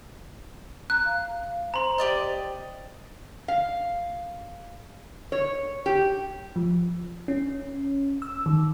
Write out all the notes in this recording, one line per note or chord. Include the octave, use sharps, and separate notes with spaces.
A#5 F#6
F5
C5 A#5 C6
G4 D5 D#5
F5
C#5
G4
F3
C#4
E6
D#3